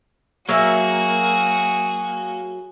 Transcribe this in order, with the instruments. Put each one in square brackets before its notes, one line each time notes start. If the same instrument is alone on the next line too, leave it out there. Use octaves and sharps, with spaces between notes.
[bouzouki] F#3 E5 [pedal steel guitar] A#3 [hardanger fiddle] F#4 G#4